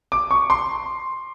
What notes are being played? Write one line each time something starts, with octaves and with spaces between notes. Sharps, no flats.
D6
C#6
C6